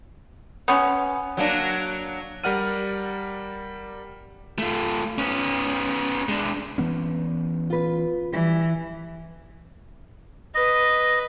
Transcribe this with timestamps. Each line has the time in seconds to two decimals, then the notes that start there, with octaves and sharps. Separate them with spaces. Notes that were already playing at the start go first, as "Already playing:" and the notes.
0.68 B3 C#4
1.37 F#3 A#3 D4
2.44 G3 A#4 D5 F#5 F6 D#7
4.59 A3 F4
5.18 B3 C#4
6.29 G#3 D4
6.78 E3 B3 C#4
7.70 F4 B4
8.33 E3 G3 E4
10.55 B4 D#5